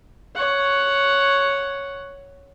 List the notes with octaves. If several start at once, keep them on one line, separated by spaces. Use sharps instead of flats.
C#5 F#5